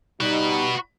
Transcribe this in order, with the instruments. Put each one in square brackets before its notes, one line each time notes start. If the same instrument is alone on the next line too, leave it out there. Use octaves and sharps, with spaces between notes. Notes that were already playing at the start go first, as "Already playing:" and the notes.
[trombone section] G3 D#4 [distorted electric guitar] F#4 B4